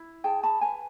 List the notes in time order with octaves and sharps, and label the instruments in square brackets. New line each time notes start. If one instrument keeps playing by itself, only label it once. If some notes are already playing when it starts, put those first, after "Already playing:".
Already playing: [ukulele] E4
G#4 G5 A5
A5 B5
B4 G#5 A#5